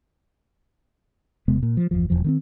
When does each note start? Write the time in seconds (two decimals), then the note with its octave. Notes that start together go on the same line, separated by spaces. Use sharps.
1.48 E1 C3 G#3 B3
1.63 A#2
1.77 F3
1.91 G1 E2 F3
2.10 E1 E2 F3
2.24 D#3 B3 C4